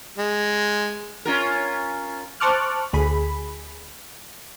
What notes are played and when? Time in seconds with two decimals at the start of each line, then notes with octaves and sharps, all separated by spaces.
0.18 G#3
1.25 C#4 F4 A#4
2.40 C5 A5 C#6 D6 F6 F#6
2.93 D2 G#4 B5